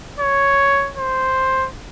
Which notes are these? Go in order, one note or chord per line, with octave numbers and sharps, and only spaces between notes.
C#5
C5